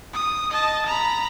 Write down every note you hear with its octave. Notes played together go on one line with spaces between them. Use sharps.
D#6
D#5 A5
A#5 B5